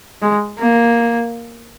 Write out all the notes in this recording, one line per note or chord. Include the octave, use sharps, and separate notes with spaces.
G#3
A#3